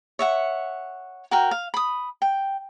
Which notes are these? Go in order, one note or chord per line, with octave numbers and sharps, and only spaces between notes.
C#5 E5 F#5
F#4 A#4 G5
F5
B5 D#6
G5